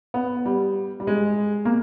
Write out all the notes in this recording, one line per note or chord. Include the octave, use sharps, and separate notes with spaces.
B3
G3
G3
G#3
A#3